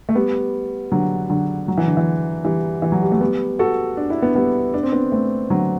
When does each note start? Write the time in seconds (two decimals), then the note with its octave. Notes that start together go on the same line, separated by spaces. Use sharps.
0.09 A3
0.15 G3 B3
0.92 D3 F#3
1.30 D3 F#3
1.68 F#3
1.78 E3
1.87 D3
1.97 E3
2.44 E3 G3
2.82 E3
2.92 F#3
3.02 G3
3.12 A3
3.21 G3 B3
3.59 F#4 A4
3.97 D4
4.10 E4
4.22 B3 D4
4.35 G3 B3
4.74 D4
4.83 C4
4.92 B3 D4
5.12 A3 C4
5.50 D3 F#3